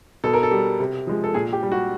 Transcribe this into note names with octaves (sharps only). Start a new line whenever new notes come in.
B2 A4
A#4
A4
G3
C3
F3 G#3
A4
A#2 G#4
G4
G3
F#4